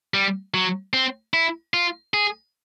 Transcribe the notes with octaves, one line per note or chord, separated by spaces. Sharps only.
G3
F#3
C4
E4
F4
G#4